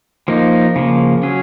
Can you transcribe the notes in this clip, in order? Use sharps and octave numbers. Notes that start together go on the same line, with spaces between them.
F3 A#3 D#4
C#3 F3 A#3
F#3 C#4 G#4